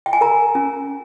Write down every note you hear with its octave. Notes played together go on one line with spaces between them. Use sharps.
G5
G#5
A#4 A#5
C#4